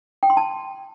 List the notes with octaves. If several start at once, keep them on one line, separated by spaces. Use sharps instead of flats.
G5
C6
A5